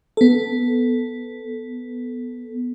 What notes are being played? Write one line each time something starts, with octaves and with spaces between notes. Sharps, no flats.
B3 A4